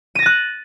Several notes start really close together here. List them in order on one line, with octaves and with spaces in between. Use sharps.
D#7 A#6 A6 F#6